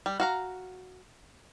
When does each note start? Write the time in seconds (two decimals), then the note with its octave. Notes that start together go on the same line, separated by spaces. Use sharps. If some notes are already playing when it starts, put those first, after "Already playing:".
0.06 G3
0.20 F#4 F5 A#5